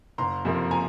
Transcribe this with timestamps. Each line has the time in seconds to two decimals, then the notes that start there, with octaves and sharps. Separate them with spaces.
0.18 F#1 A#5 C6
0.45 F2 C3 F3 A#3
0.71 G#5 A#5